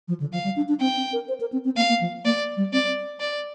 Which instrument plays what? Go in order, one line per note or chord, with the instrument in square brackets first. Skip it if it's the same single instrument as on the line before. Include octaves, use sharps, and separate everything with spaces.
[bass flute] F3
D3
[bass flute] F3 [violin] F5
[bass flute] G3
D4
D4
[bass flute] C4 [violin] G5
[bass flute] C4
A#4
C5
A#4
C4
C4
[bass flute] A#3 [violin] F5
[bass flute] A#3
F3
[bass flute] A#3 [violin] D5
[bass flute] G3
[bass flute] C4 [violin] D5
[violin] D5